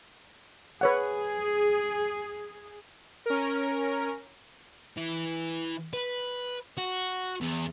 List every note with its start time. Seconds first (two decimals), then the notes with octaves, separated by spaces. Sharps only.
0.81 G#4 B4 C#5 F#5
3.26 C#4 A#4
4.97 E3
5.93 B4
6.77 F#4
7.41 E2